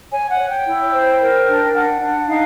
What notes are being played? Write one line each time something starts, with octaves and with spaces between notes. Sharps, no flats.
C#5 G#5
F#5
C#5
G5
E4
C5
A#4
D4
D4 F#5
D4
D#4 F5